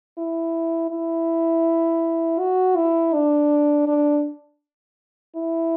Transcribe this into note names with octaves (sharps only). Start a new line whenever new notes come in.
E4
E4
F#4
E4
D4
D4
E4